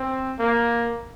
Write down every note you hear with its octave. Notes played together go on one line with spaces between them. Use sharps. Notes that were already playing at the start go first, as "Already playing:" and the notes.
Already playing: C4
A#3